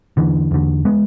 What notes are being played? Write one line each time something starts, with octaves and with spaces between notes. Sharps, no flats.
E2 D3 E3
E2 D3
G#3 B3